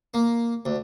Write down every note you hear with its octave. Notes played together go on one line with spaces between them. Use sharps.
A#3
D2